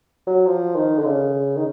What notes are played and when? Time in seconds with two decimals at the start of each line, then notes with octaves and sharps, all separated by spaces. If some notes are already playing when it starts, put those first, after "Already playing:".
0.27 F#3
0.46 F3
0.75 D#3
0.98 D3
1.05 C#3
1.56 D#3